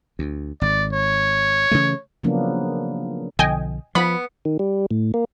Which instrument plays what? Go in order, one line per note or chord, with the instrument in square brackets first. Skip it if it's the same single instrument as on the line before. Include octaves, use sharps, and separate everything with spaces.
[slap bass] D2
[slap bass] G#1 [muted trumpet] D5
[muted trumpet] C#5
[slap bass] C#3 E3 A3
[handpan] C#3 F3 F#3 A#3 B3 D4
[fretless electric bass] B1 D3 F3 [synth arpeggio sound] D#5 G5 G#5
[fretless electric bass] F3 [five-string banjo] B3 [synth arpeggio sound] B5
[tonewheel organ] D#3
G3
A2
A#3